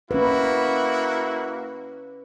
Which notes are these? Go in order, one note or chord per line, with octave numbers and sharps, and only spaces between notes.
A#3 C#4 E4 F#4 B4